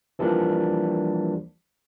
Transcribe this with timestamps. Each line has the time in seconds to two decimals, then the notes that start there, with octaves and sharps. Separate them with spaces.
0.19 E3 F3 G3 A#3 D4